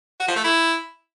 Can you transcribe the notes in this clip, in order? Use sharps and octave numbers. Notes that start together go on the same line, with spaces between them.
F#4
F3
A3
E4